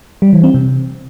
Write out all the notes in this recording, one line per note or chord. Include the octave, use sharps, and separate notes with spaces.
G3
E3
C4
C3